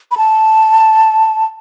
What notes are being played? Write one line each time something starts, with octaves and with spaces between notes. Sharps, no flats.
B5
A5